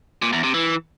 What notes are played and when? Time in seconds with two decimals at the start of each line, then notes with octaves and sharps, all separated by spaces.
0.22 A#2
0.33 E2
0.43 C3
0.54 E3